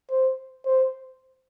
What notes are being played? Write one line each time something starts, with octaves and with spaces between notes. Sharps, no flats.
C5
C5